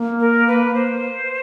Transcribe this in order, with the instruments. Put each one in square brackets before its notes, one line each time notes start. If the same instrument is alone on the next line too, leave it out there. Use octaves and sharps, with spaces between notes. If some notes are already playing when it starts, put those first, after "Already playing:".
Already playing: [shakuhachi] A#3
[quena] A#4
B4
C5